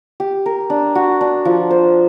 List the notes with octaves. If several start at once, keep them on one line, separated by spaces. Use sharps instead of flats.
G4
A#4
D4
F#4
D4
F3
C5